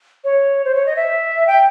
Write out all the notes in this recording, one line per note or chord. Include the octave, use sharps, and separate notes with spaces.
C#5
C5
C#5
D#5
E5
G5